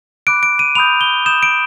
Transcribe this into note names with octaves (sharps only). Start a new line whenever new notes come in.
B5 D6 F#6 D7
D7
D#7
B5 D#6 G6 F7
G7
B5 D#6 G6 E7
D7